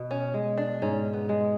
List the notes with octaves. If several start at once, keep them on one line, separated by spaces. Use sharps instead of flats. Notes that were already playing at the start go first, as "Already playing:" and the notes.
Already playing: B2
C#4
G#3
D4
G#2 C#4
B3
G#3